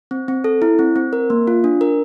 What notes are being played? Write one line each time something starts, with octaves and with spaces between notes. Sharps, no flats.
C4
C4
A4
E4
C4
C4
A#4
A#3
F4
D4
A#4